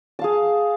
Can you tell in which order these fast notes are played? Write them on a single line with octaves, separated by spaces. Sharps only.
A5 F5 G#4